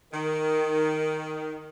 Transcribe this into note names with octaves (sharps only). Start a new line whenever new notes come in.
D#3 A#4